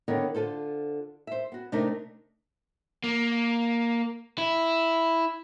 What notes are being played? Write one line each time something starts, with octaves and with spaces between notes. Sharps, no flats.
D3 D#3 B3 A#4 C#5
D3 F4 A4 C5
C5 E5
B3 F#4
C3 A3 D4 D#4 A#4
A#3
E4